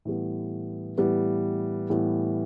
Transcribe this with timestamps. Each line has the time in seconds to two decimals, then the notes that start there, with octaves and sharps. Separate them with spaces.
0.05 A2 E3 G3 B3
0.98 A2 E3 G3 B3
1.90 A2 E3 G3 B3